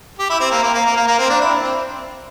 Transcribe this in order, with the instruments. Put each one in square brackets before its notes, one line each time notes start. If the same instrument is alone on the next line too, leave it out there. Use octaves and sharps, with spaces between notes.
[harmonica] G4
E4
C4
A#3
A#3
A#3
A#3
A#3
A#3
C4
D4
E4
C4